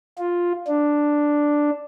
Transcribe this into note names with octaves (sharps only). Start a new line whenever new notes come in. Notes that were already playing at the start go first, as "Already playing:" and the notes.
F4
D4